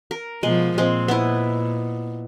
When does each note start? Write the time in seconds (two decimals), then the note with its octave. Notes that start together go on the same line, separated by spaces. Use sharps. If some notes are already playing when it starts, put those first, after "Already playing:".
0.11 A#4
0.43 B2 F3 G#3
0.78 A#2 G#3 C4
1.08 B3 E4